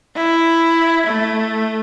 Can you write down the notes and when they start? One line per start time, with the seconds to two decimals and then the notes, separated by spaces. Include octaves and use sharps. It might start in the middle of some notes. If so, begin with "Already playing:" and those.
0.16 E4
1.07 A3